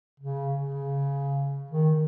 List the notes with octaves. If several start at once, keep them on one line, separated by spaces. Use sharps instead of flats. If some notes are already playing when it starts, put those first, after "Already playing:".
C#3
C#3
D#3